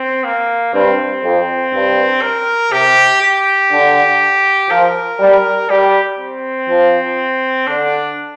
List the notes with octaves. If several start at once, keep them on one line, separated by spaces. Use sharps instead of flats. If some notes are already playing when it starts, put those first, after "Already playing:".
Already playing: C4
A#3
G2 C4
F2
G2
A#4
C3 G4
G4
D3
F3 A#4
G3
G3 G4
C4
F3
D3 D4